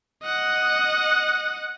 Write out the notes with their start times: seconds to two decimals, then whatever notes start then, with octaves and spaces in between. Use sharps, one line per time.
0.22 D#5 F#5